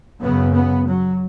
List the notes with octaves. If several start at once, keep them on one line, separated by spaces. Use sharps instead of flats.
F#2 C#3 B3
B3
F#3